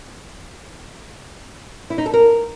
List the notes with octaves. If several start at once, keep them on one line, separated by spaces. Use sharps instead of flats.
E4
D#4
A4
A#4